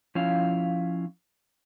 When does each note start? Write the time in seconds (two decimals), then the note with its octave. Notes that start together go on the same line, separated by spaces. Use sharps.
0.15 F3 C#4 E4 F5